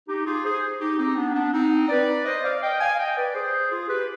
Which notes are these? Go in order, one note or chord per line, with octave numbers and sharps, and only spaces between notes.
D#4 G4
F4 G#4
G#4 C5
D#4 G4
C4 D#4
B3 D4
B3 D4
C4 D#4
B4 D5
C5 D#5
D5 F5
D#5 G5
F5 G#5
D#5 G5
B4 D5
G#4 C5
F4 G#4
G4 B4